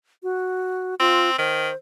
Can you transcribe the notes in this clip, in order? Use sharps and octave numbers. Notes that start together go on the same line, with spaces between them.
F#4
C4 F4
D#3 C5